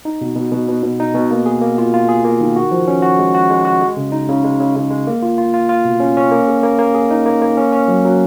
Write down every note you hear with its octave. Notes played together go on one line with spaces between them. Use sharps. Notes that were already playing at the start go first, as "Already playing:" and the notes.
D#4
B2
B2
B2
B2
B2
D#4
B2
A#3
G#4
A#3
F4
F4
G#4
A#3
D#3
F#4
F3
C#4
F#4
G#3
F#4
G#3
F#4
G#3
C#3
D#4
C#3
G#3
C#3
C#3
G#3
A#3
F4
F4
F4
F4
B2
C#4
C#4
A#3
G#4
A#3
A#3
G#4
D#4
A#3
A#3
C#4
C#4
F#3
F#3